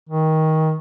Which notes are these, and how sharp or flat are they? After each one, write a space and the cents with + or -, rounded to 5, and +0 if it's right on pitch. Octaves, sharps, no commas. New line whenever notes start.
D#3 +20